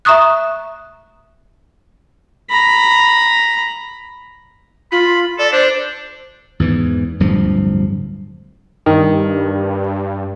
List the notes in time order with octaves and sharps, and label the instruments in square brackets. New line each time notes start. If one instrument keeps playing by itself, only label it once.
[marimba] E5 A#5 C#6 D#6 F#6
[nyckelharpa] A#5 B5
[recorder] F4 [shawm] B5
[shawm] A4 [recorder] D5
[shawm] D4 [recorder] C5
[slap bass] E2 G#2 E3
D1 G2 F3
[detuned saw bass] G2 [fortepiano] D#3